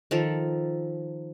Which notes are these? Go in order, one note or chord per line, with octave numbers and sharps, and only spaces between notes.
D#3 F3 A4 A#4